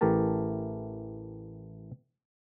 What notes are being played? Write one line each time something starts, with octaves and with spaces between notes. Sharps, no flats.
A1 E3 A3 G4 A#4 A5